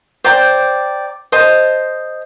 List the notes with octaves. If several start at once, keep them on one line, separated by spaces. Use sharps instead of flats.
C5 D5 G5 A#5
C5 D#5 A5